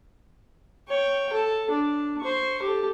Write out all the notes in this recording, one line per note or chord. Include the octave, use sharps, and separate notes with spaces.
C#5 G5
A4
D4
C5 C#6
G4 A4